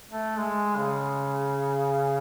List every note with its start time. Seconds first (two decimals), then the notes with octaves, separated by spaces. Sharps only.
0.11 A3
0.38 G#3
0.77 C#3